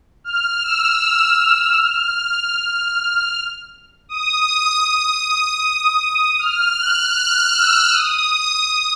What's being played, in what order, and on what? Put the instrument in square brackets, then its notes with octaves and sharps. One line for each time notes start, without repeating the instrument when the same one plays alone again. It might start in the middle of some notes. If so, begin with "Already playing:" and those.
[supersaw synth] F6
E6
F6
D#6
D#6
F6
F#6
F6
E6
D#6